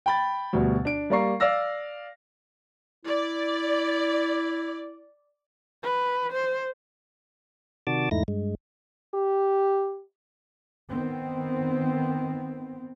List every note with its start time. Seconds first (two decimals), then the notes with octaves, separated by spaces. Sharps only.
0.06 G5 B5 A6
0.53 D2 B2 G3
0.85 D4 D7
1.10 G3 A#3 D5 A#5 C#6 C7
1.40 D5 F5 E6 A#6
3.06 E4 D5
5.83 B4
6.33 C5
7.87 C3 D#3 F#4 D5 A5 D6
8.11 E2 G#2 A3 D#4 E4 A#6
8.28 G2 G#3
9.14 G4
10.88 D#3 B3 C4